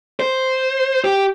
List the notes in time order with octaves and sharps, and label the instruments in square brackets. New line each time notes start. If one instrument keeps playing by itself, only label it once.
[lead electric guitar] C5
G4